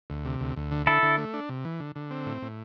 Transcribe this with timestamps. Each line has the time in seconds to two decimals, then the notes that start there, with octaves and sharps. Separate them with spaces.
0.10 D2
0.25 C3
0.40 D2
0.56 D2
0.71 D3
0.86 D3 E4 A4
1.03 D3
1.18 A3
1.34 D4
1.49 C3
1.65 E3
1.80 D3
1.96 D3
2.11 C4
2.26 A2
2.42 A2